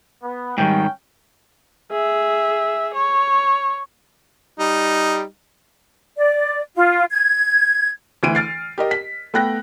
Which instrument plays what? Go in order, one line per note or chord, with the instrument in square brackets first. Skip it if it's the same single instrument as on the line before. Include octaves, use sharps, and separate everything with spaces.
[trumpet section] B3
[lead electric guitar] G#2 D#3 [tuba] G3 [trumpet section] C#4 G5
[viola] G#4 E5
C#5
[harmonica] G3 D#4
[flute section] D5
F4
G#6
[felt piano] D2 E3 D7 D#7
F6 A6 C7
G4 A#4 D#5
B6
A3 B3 G5 F#6 A#6